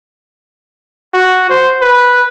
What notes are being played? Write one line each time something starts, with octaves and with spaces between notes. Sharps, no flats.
F#4
C5
B4